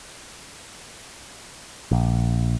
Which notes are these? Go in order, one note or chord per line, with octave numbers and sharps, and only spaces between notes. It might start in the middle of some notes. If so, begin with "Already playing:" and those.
A#1